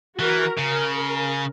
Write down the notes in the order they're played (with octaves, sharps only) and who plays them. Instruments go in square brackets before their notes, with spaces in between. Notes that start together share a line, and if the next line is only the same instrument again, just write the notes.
[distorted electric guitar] E3 [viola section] F#4 A#4
[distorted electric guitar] C#3 [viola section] A#4